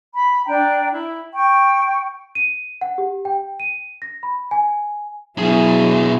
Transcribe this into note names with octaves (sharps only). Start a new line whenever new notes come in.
B5
D4 G5 A#5
E4
G5 C#6
D#7
F#5
G4
G5
D#7
A#6
B5
G#5
B2 F#3 E4 G#4